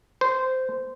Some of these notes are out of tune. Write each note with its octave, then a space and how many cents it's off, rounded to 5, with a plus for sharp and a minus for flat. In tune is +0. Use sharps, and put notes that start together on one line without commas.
C5 -15